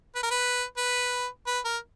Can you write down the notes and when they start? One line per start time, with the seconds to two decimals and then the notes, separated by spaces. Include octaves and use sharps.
0.15 B4
0.23 A#4
0.31 B4
0.77 B4
1.47 B4
1.65 A#4